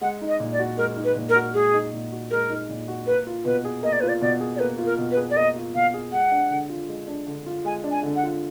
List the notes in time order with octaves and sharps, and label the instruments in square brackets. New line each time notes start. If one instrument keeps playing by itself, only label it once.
[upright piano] G#3 [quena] F#5
[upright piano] D#4
[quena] D#5
[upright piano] A#2
[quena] D5
[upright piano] F#4
[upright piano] G#3 [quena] A#4
[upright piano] D#4
[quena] B4
[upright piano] A#2
[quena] A#4
[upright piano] F#4
[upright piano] G#3 [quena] G#4
[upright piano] D#4
A#2
F#4
[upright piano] G#3 [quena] A#4
[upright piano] D#4
A#2
F#4
[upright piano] A#3 [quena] B4
[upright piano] F4
[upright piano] B2 [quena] B4
[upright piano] G#4
[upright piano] A#3 [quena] D#5
[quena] D5
[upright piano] F4 [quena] B4
[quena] D5
[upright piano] B2 [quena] D5
[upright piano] G#4
[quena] D5
[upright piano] A#3 [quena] B4
[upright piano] F4
[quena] A#4
[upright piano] B2
[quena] B4
[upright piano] G#4
[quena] D5
[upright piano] A#3 [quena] D#5
[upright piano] F4
[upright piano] B2 [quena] F5
[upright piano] G#4
[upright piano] G#3 [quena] F#5
[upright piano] D4
D3
F4
G#3
D4
D3
F4
[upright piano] G#3 [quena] G#5
[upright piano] D4
[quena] G#5
[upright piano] D3
[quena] F#5
[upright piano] F4